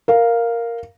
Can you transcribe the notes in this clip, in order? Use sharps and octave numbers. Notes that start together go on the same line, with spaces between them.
A#4 F5